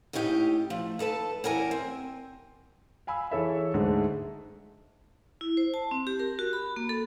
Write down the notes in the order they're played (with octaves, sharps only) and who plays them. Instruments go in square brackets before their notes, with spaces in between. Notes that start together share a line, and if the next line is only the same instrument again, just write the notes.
[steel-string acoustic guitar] D#2 A2 C#4 D#4 G4
F3 A3
D#2 A4 B4 A5
E2 C#4 G4 A#4 E5 G#5
C4
[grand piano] F5 G#5 B5 E6
E3 E4 G#4 A4 C#5 E5
D2 G#2 D3 G#3
[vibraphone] E4
C5
A5
C4
G4
A#4
F#4
B5
A#3
A4